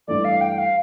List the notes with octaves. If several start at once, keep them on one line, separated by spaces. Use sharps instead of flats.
G2 E3 A3 D5
F5
G5
F5